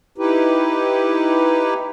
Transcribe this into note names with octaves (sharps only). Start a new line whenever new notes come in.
D#4 E4 G4 B4